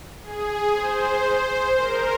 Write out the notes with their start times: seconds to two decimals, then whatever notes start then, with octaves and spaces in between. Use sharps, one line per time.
0.22 G#4
0.73 C5
1.25 C5
1.76 A#4